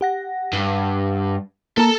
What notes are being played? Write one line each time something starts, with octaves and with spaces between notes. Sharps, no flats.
G4 F#5 A#6
G2
A#3 A4 A5 A#5